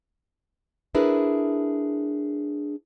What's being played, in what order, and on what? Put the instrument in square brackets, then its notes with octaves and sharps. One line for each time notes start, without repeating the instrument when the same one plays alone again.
[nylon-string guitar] D4 E4 G#4 A#4 B4